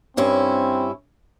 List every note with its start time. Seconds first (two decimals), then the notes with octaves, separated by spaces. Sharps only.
0.17 G2 C4 C#4 E4